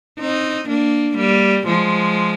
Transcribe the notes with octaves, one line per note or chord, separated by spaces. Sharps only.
C4 D#4
A#3 D4
G3 A#3
F3 G#3